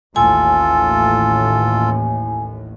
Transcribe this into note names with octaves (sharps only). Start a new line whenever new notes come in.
A1 D#2 A2 F4 A4 G#5